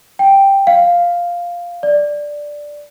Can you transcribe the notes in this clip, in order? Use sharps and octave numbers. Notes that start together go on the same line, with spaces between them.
G5
F5
D5